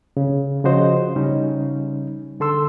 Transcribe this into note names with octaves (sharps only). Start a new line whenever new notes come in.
C#3
C#3 F3 F#4 C5 D#5
C#3 G3 C#4 D#4
D3 A4 C6 E6